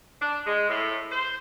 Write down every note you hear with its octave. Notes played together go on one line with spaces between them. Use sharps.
D4
G#3
A2
C5